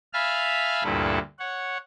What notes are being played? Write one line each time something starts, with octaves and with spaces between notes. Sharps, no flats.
E5 F5 G#5 A5 B5 F6
D2 G2 A#2 E4 A4
C#5 F#5